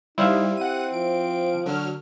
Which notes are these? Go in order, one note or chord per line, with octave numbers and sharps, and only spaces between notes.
G3 D#4 E4 C5 F5
C4 G4 F#5 D#7
F3 D7
D3 F#3 F6